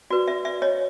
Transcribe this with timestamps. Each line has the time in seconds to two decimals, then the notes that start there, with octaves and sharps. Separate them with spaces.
0.10 F#4 B4 D5
0.28 D5 E5
0.45 D5 E5
0.62 C#5 D#5